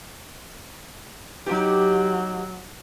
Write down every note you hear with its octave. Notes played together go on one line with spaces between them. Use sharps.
F#3 D#4 G4